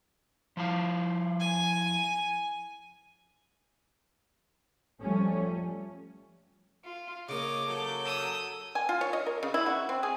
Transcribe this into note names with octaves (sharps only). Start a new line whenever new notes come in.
F3 E4 F5
G#5
F3 G3 A3 C#4
F4
C#3 A#3 C#5 D#5 D6
F#3 A4 G6
D#6 E6
G#5
F4
C#5
D#5
A#4
C#3
E4
F#4
C4
G#4